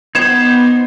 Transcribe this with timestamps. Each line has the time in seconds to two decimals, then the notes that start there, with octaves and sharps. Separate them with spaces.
0.15 B3 D#4 C5 G5 G#6 E7